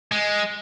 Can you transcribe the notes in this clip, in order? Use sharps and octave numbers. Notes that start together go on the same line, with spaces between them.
G#3